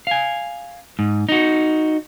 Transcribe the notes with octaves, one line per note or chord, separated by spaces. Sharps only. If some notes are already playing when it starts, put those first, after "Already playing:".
F5 G#5
G#2
D#4 F#4